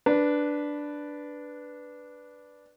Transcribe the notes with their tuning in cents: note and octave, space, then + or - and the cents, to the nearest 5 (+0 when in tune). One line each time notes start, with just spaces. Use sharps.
D4 +0 B4 +0